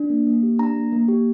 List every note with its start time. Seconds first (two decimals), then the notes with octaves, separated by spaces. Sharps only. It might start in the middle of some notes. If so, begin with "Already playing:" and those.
Already playing: D4
0.10 A#3
0.27 A#3
0.43 G4
0.59 D4 A#5
0.76 A#3
0.92 A#3
1.08 G4